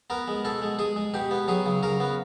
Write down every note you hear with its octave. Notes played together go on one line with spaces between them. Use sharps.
B3 A#4
G#3
B2 A4
G#3
G#3 G#4
G#3
B2 G4
B3
F#3 G#4
C#3
C#3 A#4
B3